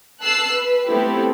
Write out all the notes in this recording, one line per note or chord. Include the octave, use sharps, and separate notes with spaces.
A5 E6 F#6 C7
B4
A3 B3 C4 E4 G4 A4